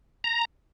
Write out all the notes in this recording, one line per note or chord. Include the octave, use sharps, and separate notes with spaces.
A#5